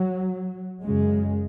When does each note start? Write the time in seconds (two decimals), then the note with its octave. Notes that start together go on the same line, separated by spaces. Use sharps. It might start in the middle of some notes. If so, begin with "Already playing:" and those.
Already playing: F#3
0.82 F#2 C#3 G#3